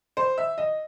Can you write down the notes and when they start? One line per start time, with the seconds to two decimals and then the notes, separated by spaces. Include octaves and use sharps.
0.17 C5
0.38 E5
0.58 D#5